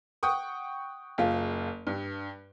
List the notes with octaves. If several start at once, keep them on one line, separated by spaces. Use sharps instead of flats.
F#5 G5 C#6 D#6
F#1 F4
G2